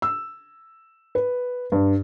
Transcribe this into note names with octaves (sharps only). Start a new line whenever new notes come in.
E6
B4
G2